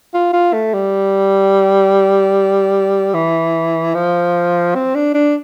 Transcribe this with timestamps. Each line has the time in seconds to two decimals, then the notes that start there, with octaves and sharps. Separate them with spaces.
0.14 F4
0.33 F4
0.53 A3
0.74 G3
3.14 E3
3.94 F3
4.75 C4
4.95 D4
5.14 D4